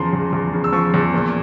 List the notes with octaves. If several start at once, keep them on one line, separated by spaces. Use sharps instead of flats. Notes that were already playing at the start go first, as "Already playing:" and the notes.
Already playing: E2 C#3 F3 A#5 C6
E2
E2
C#3
E6
F3 C#6
E2
A#2